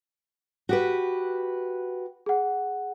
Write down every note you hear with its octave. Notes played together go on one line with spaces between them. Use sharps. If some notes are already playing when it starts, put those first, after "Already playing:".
F#4 G4 B4
G#4 F#5